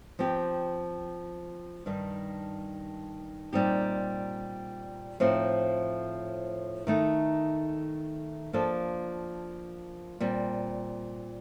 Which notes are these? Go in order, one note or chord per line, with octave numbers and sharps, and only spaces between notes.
F3 C4 G4
G2 D#3 G3
A#2 G3 C4 D#4 G4
A2 F3 C4 D#4
D#3 A3 D#4
F3 A#3 D4 F4 A4
A#2 G3 C4